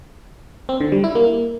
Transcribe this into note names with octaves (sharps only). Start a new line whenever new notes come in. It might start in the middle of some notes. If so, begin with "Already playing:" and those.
C4
D3
G3
E4
A#3